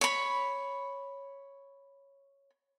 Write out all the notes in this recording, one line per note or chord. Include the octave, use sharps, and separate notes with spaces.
C#5 B5